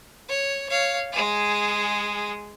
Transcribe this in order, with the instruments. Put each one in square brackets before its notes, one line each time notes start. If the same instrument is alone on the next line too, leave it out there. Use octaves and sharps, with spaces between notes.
[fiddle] C#5
C#5 F5
G#3 G#4